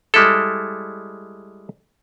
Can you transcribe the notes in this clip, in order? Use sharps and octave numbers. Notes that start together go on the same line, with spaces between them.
G3 G#3 E4 A4